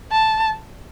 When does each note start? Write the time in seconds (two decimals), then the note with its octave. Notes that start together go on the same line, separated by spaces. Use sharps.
0.12 A5